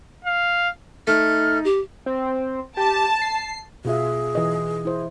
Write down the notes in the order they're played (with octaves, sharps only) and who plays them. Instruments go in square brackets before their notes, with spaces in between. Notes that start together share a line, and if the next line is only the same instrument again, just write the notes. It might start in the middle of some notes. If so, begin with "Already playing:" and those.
[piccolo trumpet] F5
[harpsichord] A3 [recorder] D#4 [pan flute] F6
[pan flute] G4
[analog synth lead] C4
[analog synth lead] G4 [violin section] A5
[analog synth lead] C7
[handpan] B2 F4 E5 [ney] G#4
[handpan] E3 D#5
E4 C5